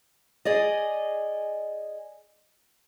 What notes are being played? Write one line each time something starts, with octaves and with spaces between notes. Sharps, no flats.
G#4 D5 D#5